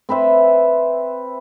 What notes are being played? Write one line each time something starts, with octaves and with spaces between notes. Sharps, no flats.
C4 B4 C5 E5